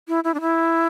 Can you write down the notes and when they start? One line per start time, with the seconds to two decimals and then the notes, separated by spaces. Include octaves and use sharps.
0.08 E4
0.24 E4
0.34 D4
0.41 E4